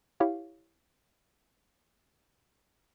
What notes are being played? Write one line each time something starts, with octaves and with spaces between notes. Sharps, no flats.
E4 G4 C#5 F5